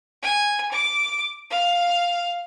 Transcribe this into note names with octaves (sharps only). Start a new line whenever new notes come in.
G#5
D6
F5